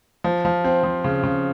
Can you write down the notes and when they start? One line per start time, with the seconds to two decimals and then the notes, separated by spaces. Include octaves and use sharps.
0.24 F3
0.45 F3
0.64 C4
0.84 F3
1.04 C#3
1.24 C#3